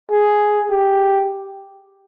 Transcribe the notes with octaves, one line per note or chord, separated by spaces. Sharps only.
G#4
G4